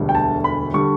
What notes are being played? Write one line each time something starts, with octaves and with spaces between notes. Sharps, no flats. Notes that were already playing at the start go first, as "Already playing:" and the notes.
Already playing: E1 D2 D3 G3
G5
A5
B5
D3 G3 C#6